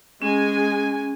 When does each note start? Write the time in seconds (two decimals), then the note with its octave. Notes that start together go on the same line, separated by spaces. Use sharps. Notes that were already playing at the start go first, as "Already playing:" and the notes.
0.22 G#3 C#4 G#5